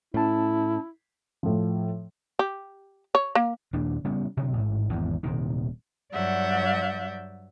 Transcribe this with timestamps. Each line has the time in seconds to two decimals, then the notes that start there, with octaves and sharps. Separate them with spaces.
0.14 A2 C#4 E4 A5
1.43 A2 F3
2.39 G4
3.15 C#5
3.35 A#3
3.73 D#1 D#2 A#2 D4
4.05 C#3 G3 B3
4.37 B2 D3 F#3 C4
4.53 A1 G#2
4.92 G#1 E2 G#2
5.23 D#1 C3 D#3
6.12 G2 F#3 D5 E5 F#5 G6